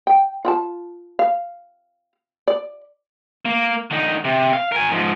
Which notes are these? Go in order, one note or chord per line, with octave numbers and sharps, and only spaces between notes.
G5
F4 G5 A5
F5
D5
A#3
D3 D#4
C3
F5
A#4 G#5
G#2 F3